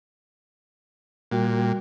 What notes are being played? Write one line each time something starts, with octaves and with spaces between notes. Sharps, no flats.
A#2 G3 F#4 G5